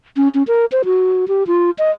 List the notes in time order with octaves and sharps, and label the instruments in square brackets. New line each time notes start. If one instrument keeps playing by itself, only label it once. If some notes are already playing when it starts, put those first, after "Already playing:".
[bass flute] C#4
C#4
A#4
C5
F#4
G4
F4
D#5